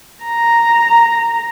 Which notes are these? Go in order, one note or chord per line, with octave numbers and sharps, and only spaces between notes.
A#5